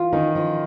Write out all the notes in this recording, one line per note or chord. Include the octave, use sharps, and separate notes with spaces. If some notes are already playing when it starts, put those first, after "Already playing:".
Already playing: E3 F4
D#3 C#4 D#4
F3